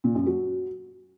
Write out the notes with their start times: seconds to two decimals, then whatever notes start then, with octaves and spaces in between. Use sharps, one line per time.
0.04 A#2
0.15 F#2
0.26 F#3